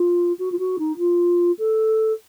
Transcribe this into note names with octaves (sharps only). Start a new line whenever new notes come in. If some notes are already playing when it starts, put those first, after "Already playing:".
Already playing: F4
F#4
F4
F#4
D#4
F4
A4